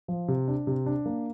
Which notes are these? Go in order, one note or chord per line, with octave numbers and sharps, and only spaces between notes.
F3
C3
D4
C3
D4
A#3